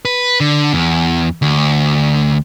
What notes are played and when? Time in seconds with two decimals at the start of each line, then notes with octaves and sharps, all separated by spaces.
0.05 B4
0.40 D3
0.73 E2
1.42 D2